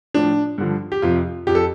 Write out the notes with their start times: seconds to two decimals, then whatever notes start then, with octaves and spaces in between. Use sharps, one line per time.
0.14 A2 F3 D4
0.58 G2 D3 F3
0.92 G4
1.02 F2 C3 F3 F4
1.47 F2 F3 G4
1.55 A4